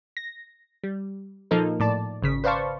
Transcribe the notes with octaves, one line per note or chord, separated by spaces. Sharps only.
A#6
G3
A#2 F3 A#3 D#4 A4 A#4
A2 D5 A5
G#1 C#3 B6
B4 C5 D5 F5 A5 C#6